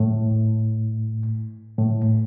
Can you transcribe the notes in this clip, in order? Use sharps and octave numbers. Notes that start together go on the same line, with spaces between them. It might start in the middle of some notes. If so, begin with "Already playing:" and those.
Already playing: A2
A2